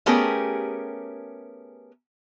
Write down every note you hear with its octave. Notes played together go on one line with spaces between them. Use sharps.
A3 B3 C#4 G4 G#4 A#4